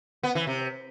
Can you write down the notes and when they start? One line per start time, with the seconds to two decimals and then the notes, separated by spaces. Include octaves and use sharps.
0.23 B3
0.35 E3
0.47 C3